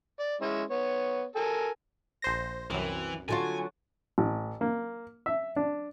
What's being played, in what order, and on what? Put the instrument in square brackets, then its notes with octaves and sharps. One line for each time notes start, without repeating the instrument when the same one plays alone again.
[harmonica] D5
G#3 C#4 E4
B3 C#5
A4 A#4 G#5
[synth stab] A#1 C5 A#6
[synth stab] C2 F#2 [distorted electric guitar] E3 [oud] C4
[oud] D3 F#3 F4 [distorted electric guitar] G#5
[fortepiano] A1
A#3
E5
D4